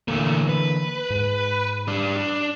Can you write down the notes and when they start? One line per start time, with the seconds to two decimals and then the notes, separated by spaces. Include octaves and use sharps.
0.08 A#2 D3 E3 A3 A#3
0.49 B4
1.10 G#2
1.88 G3 D4
2.17 D4